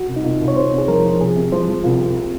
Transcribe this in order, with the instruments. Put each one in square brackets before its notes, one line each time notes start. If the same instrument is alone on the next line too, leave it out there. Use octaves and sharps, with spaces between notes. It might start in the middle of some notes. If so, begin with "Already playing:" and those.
Already playing: [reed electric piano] F#4
[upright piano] C2
[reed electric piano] D#4
[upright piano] C2 [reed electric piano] F4
[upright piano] C2
[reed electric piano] C#5
[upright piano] C3 [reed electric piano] C5
[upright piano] C2
[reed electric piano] G#4
[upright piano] F3 [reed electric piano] A#4
[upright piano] F3
[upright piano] C2 [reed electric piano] G#4
[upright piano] C3
[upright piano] F3 [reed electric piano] C5
[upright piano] F3
[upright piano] C2 [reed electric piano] F4
[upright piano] C3